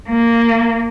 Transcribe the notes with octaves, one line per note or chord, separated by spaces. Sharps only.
A#3